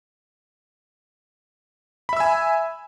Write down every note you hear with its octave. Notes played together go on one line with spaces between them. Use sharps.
E5 G#5 B5 E6